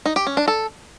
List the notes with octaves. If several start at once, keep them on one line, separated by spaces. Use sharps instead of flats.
D#4
G4
C#4
D4
A4